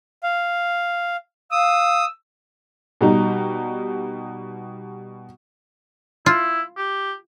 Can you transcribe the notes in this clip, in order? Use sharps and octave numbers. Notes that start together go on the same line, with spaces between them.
F5
F5 D#6 E6
B2 G3 D#4
E4 F4
G4